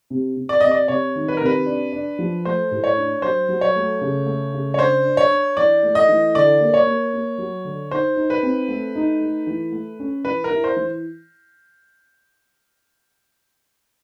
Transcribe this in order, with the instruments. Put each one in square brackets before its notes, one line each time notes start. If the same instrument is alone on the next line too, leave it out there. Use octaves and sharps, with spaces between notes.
[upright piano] C3
C3
[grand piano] D5
[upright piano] C3 [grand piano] D#5
[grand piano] D5
[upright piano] C3 [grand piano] C#5
[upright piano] D#3
[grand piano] B4
[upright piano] C3 [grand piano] A#4
[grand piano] B4
[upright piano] D4
D4
F3
[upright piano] A3 [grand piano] C5
[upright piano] A2
[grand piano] C#5
[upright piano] D4
[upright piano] F#3 [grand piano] C5
[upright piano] F#3
[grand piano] C#5
[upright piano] A3
C#3
A3
C#3
[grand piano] C#5
[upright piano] D4 [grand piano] C5
[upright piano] D4
[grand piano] C#5
[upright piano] D4
[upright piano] E3 [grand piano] D5
[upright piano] A3
[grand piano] D#5
[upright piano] E3
[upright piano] D3 [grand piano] D5
[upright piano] A#3
[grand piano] C#5
[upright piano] A#3
A#3
F#3
D3
[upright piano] D#4 [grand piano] C5
[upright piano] D#4
[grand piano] B4
[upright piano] C4
A3
D#4
A3
E3
A3
C#4
[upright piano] E3 [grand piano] B4
[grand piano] A#4
[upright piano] E4
[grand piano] C5
[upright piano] E3